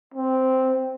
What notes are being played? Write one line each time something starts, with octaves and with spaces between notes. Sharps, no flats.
C4